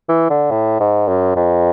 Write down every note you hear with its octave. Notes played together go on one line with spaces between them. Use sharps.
E3
D3
A2
G#2
F#2
F2